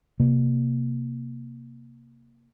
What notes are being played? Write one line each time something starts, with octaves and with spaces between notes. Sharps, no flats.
C3 A#3